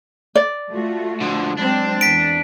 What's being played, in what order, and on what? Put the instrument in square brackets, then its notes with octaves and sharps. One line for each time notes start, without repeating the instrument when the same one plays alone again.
[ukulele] D5
[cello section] A3 F4 F#4
[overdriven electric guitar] D3 F3
[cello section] F#3 G#3 C4 [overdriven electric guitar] D4
[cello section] E2 [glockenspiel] B6 D7